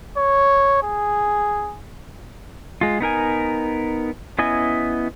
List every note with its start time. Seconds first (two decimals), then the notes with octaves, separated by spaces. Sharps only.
0.18 C#5
0.83 G#4
2.81 G#3 F4
3.00 B3 D#4 A#4 G#5
4.39 B3 C#4 E4 D#5 G#5